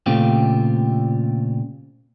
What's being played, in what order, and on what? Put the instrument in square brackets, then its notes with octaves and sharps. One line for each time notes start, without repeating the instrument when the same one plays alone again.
[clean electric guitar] A#2 C#3 A3 C4 F4 G4